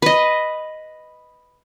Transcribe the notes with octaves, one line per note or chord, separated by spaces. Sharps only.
B4 D#5